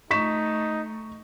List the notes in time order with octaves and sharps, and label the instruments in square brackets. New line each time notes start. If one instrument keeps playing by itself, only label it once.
[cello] A3 [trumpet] D#4 [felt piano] C#6 B6 E7